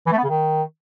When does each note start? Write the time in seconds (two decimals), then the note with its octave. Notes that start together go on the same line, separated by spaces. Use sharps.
0.07 E3
0.12 A3
0.18 B3
0.23 C#3
0.29 D#3